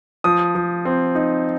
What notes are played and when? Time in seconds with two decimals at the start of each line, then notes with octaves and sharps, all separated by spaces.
0.24 F3 D#6
0.55 F3
0.85 C4
1.15 D#4